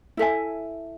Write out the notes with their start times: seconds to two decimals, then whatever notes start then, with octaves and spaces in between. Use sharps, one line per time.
0.17 E4 A4 E5 G#5